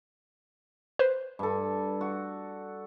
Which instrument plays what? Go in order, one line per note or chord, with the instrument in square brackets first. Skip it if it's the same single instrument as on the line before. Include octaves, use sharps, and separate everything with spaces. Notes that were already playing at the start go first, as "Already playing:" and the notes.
[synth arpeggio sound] B4 C5
[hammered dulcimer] G2 A4
F#4